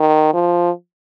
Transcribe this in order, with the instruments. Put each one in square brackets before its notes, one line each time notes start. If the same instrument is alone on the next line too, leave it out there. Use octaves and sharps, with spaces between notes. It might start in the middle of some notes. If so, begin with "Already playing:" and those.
Already playing: [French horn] D#3
F3